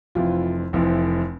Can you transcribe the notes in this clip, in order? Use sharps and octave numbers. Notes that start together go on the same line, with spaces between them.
F1 F2 E3 F4
F1 F2 E3